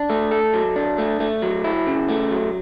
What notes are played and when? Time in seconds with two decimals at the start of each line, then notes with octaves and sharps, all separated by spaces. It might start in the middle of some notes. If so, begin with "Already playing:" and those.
Already playing: D4
0.10 A3
0.31 A4
0.54 F#3
0.76 D4
0.98 A3
1.20 A3
1.42 F#3
1.64 E4
1.87 C#3
2.09 A3
2.31 F#3